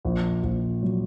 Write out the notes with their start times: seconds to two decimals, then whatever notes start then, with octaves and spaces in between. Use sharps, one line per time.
0.05 A#1
0.43 A#1
0.83 F#3